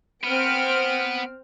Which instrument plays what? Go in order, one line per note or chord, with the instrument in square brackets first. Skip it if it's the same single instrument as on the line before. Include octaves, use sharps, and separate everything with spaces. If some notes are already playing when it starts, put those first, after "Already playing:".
[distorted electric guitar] B3 [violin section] C4 F6 D7